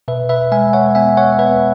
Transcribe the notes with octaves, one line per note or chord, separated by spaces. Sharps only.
B2 B4 E5
B4 E5
G#3 E5 G#5
C#5 F#5
B3 E5 G#5
C#5 F#5
B3 B4 E5